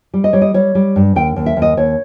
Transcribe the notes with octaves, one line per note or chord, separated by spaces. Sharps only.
G3
D#5
G3 C#5
D#5
G3 C#5
G3
G2
D#2 G5
D#2
E5
D#2
D#5
D#2 C#5